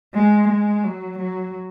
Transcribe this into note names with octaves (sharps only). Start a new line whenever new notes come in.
G#3
G#3
F#3
F#3